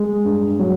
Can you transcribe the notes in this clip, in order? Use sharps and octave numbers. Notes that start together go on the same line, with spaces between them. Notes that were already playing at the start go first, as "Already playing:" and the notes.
Already playing: G#3
G2
F#3